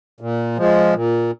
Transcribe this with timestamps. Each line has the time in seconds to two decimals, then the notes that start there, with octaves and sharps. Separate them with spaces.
0.21 A#2
0.57 F3 G#3
0.94 A#2